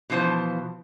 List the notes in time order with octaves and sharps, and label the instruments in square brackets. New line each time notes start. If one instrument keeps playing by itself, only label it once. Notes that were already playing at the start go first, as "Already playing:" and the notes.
[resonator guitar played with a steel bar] B2 E3 F3 C5 A5